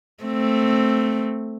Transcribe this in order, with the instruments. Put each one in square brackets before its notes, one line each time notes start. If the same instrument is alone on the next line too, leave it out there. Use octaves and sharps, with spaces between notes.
[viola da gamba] A3 C4